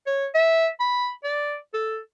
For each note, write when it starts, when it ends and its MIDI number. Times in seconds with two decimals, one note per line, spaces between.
0.06 0.27 73
0.34 0.69 76
0.80 1.11 83
1.24 1.57 74
1.74 1.99 69